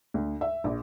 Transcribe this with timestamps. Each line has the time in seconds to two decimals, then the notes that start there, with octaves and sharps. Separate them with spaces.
0.14 D2
0.41 E5
0.64 A#1